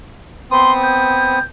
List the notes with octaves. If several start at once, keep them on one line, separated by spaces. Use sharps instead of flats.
B3 C4 C6 D#6
G6